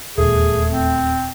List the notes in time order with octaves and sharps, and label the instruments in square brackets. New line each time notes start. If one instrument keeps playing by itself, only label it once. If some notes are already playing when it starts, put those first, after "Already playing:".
[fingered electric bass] D#1 E2 [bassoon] A3 [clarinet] G#4
[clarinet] C4